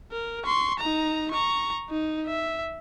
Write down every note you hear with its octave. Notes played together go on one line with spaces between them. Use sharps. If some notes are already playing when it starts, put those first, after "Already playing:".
A#4
C6 C#6
D#4 A#5
A#5 C#6
D#4
E5